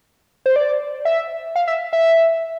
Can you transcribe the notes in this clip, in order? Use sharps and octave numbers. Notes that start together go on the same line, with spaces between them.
C5
D5
E5
F5
E5
E5